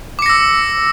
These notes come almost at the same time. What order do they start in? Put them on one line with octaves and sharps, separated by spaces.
D6 C#7 A#6 E6